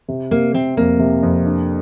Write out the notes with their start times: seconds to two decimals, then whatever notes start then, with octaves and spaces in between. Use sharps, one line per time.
0.08 C3
0.31 C3 A#3
0.54 C3 C4
0.77 F2 A#3
0.99 C3
1.23 F2
1.46 D4